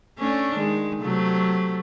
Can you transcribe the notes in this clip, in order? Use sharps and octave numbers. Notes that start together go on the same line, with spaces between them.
A3 C#4 D4
D#3 G#3
C3 F#3 A3